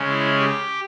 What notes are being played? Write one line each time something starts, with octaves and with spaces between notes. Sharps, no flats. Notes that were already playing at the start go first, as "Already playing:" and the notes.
Already playing: C#3 G#3 C#4
E4
G4